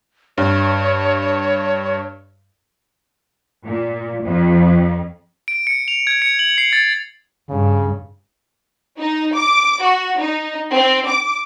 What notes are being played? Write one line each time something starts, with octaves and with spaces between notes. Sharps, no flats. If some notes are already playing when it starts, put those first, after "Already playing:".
G2 C#5
A#2
F2
D7
C#7
F7
G#6
C#7
F#7
C7
A6
G2 C#3
D#4
D6
F#4
D#4
C4
D6